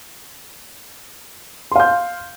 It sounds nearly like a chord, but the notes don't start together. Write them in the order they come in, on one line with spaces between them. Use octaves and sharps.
C6 F5 G6